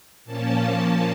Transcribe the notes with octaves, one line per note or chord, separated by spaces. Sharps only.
A#2 F3 A#3 C#4 A5